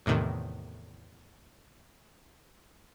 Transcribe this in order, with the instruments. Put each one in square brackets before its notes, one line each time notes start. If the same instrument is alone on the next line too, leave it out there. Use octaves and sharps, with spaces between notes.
[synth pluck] E2 A2 C3 D#3